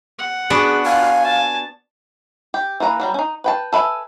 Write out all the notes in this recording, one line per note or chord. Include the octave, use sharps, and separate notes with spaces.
F#5
B3 D4 F#4 G#4
F5 G#5
A5
G4
E3 A#3 B4 A#5
F#3 G3 A#5
C#4 D#4
B4 G5 A5
A4 B4 E5 G#5